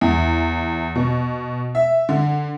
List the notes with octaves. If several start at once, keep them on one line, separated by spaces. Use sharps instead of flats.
E2
B2
E5
D3